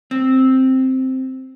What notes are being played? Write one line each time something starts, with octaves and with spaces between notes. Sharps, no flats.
C4